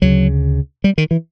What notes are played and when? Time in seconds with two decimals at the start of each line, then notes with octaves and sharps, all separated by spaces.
0.02 D2 C#3 F#3
0.84 G3
0.98 D#3
1.11 E3